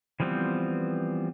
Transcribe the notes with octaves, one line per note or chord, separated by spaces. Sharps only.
E3 F3 G3 B3 C4